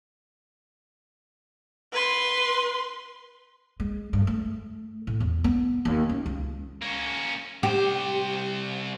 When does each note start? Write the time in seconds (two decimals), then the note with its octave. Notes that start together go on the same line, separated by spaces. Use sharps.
1.93 B4 C6
3.80 G#3
4.13 G2
4.27 A3
5.07 A2
5.20 E2
5.44 B3
5.85 D#2
6.09 F#2
6.26 C#2
6.82 A#3 C#4
7.63 C2 G4 C5